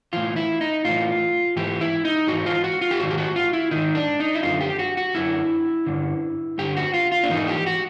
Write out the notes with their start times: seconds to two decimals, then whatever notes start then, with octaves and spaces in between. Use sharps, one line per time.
0.13 A2 E3 F4
0.36 E4
0.61 D#4
0.85 A2 E3 F4
1.56 G#2 E3 G4
1.81 E4
2.05 D#4
2.27 G#2 E3 F#4
2.46 F4
2.64 F#4
2.81 F4
2.91 G4
3.00 G#2 D#3 F#4
3.11 G4
3.18 F#4
3.36 F4
3.53 E4
3.71 G#2 D#3 D#4
3.95 D4
4.20 D#4
4.34 E4
4.43 F#2 D3 F4
4.61 G4
4.79 F#4
4.97 F#4
5.15 F#2 D3 E4
5.86 G2 D3
6.58 G2 D3 G4
6.77 F#4
6.94 F4
7.12 F4
7.23 D4
7.30 G#2 E3 D#4
7.48 G4
7.66 F#4